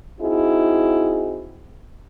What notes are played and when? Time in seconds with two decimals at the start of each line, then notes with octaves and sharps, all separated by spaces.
0.19 C4 D#4 E4 F#4 G#4